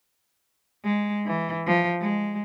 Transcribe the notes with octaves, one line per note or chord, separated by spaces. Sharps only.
G#3
E3
F3
G#3